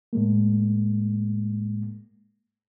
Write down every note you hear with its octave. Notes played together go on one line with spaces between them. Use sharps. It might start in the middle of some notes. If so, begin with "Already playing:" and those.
A2 G#3 A#3